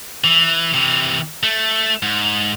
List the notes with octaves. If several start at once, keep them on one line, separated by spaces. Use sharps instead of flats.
E3
C3 E3
A3
G#2